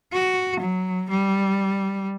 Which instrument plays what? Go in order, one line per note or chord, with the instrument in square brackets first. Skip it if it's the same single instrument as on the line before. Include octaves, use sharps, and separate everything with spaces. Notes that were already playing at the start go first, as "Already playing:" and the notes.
[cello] F#4
F#3
G3